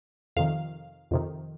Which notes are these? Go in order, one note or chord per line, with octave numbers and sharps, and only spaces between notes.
F2 C3 D#3 F5
F2 C3 D#3